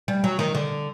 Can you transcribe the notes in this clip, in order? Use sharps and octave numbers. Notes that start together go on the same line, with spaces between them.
G3
F#3
D#3
D3